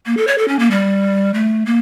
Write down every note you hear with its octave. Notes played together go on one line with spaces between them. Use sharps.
A#3
A4
C#5
A4
C#4
A#3
G3
A3
A#3